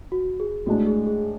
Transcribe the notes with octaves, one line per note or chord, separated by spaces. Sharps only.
F#4
G#4
A2 G#3 D4 F#4
G#4
G#4